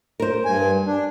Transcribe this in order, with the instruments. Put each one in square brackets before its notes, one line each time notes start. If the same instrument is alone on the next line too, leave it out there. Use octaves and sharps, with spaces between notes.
[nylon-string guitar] A#4 C5
[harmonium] G2 G#5
D4